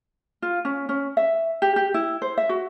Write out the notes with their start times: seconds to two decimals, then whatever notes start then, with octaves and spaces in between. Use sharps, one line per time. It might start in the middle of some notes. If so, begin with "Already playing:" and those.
0.42 F4
0.65 C#4
0.89 C#4
1.17 E5
1.62 G4
1.76 G4
1.94 E4
2.22 C5
2.38 E5
2.49 F#4